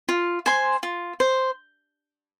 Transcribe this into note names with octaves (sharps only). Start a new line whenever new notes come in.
F4
C5 G#5 C6
F4
C5